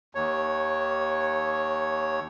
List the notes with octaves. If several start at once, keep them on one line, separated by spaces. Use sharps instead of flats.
D#2 C#5